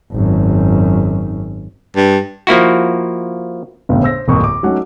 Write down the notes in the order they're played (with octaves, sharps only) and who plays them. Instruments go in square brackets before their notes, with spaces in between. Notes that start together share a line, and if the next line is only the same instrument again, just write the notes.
[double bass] G#1 F#2
[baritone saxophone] G2
[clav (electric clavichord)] F3 A#3 E4 F#4
[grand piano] G1 E2 A2 C#3
C5 E6 A#6
D1 G#1 F2 A#3 C#6 D#6
D6
F#3 A3 C#4 D#4 F#5